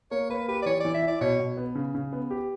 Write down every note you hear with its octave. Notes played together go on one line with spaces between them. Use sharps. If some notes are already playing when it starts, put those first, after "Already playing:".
A#3 C#5
A#3 B4
G4 B4
D5
E3 C#5
E3 D5
E5
E4 D5
B2 C#5
B2
B3
C#3
C#3
B3
G4